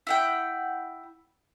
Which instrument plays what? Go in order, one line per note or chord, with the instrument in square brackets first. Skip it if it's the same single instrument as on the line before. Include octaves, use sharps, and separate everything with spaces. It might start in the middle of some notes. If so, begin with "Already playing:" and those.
[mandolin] E4 F#5 G5